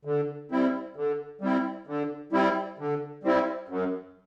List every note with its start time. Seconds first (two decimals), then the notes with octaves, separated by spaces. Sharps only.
0.05 D3
0.51 G3 C4 E4
0.96 D3
1.41 G3 C4 E4
1.87 D3
2.32 G3 C4 E4
2.79 D3
3.23 G3 C4 E4
3.69 F#2